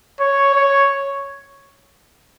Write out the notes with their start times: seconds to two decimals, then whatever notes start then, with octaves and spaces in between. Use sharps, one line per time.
0.20 C#5
0.54 C#5